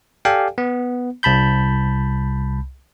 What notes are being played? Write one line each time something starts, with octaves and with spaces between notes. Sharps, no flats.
G4 A4 D5 F5 G5 G#5
B3
C2 A5 B5 G6